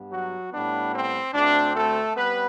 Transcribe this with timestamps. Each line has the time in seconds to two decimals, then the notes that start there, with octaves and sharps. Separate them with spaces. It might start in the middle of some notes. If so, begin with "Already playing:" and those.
Already playing: G2 B3
0.11 F#3 F#4
0.52 A2 G3 B3 D4
0.94 C4
1.34 D2 D3 A3 C4 D4
1.75 A3 A4
2.16 G3 B3 C4 B4